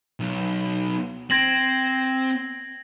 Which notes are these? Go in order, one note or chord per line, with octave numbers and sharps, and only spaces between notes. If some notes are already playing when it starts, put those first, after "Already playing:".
B1
C4 G#6 A#6 F#7